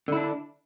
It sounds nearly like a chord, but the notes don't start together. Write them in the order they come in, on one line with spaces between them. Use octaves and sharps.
D3 E4 D4